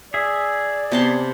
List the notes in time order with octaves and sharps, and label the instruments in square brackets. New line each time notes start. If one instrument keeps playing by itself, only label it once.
[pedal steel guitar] G#4 E5 [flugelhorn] D5
[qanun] C3 A5 C6 [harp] B3